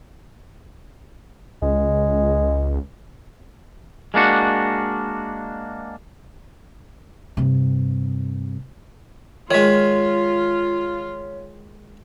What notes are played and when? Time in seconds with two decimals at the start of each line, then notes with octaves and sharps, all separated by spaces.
1.62 C#2 G#3
4.14 G#3 A#3 D4 F#4
7.37 G2 C3
9.51 D#3 G#3 F4 C#5 B6